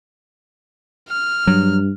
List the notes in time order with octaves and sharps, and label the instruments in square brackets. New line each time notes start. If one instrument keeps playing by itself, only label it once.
[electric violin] F6
[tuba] G2 [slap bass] F#3